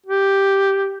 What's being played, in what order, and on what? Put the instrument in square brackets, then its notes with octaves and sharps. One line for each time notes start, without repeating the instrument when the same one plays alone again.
[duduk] G4